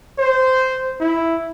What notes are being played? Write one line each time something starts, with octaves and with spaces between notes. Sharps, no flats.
C5
E4